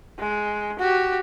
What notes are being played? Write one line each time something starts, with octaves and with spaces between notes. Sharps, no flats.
G#3
F#4 G4